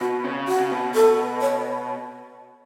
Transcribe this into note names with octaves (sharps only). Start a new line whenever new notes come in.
B2 F#4
C#3
F#4
C#3
B2
A4
C#5